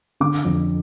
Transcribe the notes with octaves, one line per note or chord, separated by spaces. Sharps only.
D3 D6
F2